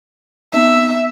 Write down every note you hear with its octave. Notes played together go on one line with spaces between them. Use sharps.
B3 C4 D#4 E5